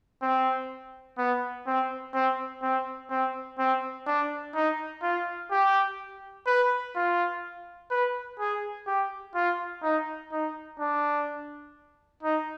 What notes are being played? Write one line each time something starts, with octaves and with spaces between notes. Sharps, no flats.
C4
B3
C4
C4
C4
C4
C4
D4
D#4
F4
G4
B4
F4
B4
G#4
G4
F4
D#4
D#4
D4
D#4